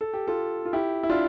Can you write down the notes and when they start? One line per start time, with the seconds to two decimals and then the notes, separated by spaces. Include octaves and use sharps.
0.01 A4
0.14 G4
0.27 F4 A4
0.66 F4
0.73 E4 G4
1.03 E4
1.10 D4 F4